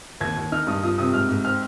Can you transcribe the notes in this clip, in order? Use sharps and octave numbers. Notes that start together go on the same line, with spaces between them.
D#2 G#6
D#2
D#4 F6
G2 D#6
F4 D#6
C3 D#6
G#2 F6
G#2
C4 F6